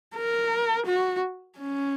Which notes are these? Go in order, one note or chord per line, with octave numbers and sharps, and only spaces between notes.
A#4
F#4
C#4